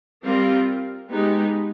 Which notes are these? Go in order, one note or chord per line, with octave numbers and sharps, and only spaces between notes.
G3 C4 F4 A#4
G#3 B3 D#4 G4